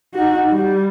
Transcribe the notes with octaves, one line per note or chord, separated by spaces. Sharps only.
D#4 F#4
G3